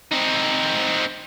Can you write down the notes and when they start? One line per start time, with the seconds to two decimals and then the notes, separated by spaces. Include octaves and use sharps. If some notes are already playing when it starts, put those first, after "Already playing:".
0.12 C4 D#4